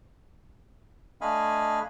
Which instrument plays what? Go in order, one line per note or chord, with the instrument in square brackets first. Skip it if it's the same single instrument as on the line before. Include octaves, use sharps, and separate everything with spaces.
[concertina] A3 D4 D#5 F5 G#5 B5